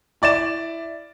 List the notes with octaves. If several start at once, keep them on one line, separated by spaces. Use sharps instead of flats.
E4 D5 A6 E7